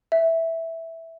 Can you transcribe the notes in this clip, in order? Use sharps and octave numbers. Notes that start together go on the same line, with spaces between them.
E5